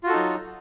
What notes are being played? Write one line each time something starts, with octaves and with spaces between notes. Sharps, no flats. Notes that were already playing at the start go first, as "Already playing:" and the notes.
F#3 D#4 F4 F#4 A4